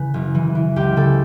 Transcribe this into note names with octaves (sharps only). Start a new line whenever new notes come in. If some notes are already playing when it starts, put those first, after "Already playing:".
Already playing: C#3 E3 B4
F#1
E3
E3
C#2 G4
C#3 A4